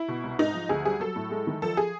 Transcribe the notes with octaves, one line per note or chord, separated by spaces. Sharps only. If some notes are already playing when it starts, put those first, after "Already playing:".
Already playing: E4
B2
C2
G#2 D#4
F3
D2 G#4
G3 G#4
F#3 A4
A2
G#3
D#3
F3 A4
G#4